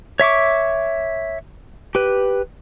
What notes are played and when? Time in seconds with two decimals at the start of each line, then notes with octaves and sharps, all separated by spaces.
0.20 C#5 E5 C#6 D6
1.95 G4 B4